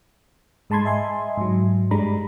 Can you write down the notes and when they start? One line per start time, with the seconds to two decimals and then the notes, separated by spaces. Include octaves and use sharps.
0.70 G#2 G#3 A5 B5 C6 G#6
0.85 D#5 E5 G#5 C6
1.37 G#2 F#3
1.91 G2 G3 G#3 D4 A#5 B5